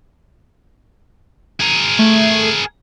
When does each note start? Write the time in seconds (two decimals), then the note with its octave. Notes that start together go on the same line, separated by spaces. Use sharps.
1.60 G#4 A#4
1.99 A3